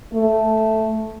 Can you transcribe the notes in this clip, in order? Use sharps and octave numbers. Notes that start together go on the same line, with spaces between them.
A3